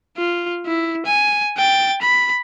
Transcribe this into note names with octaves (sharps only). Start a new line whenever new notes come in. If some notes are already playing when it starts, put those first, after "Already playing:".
F4
E4
G#5
G5 A6
B5